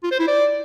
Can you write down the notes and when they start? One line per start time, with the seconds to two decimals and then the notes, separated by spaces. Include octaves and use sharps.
0.04 F4
0.12 C5
0.20 E4
0.28 D5